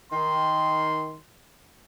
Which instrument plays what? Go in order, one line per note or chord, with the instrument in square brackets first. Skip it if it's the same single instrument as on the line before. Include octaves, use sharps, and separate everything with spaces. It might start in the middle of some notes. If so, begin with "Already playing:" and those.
[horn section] D#3 C6